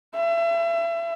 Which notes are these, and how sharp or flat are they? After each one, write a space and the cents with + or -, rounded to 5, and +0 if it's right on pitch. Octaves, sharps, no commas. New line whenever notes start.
E5 +35